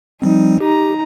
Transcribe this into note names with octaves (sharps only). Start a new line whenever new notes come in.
F3 G3 C4 D#4
D#4 G4 A#5